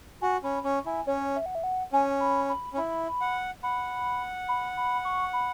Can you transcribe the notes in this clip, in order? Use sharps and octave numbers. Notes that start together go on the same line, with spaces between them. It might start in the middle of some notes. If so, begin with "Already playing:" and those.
F#4 G#5
C#4 B5
C#4 C#6
E4 G#5
C#4 C#5
E5
F#5
E5
F#5
C#4 G#5
B5
B5
C#4
E4 B5
F#5
F#5 B5
B5
B5
C#6
B5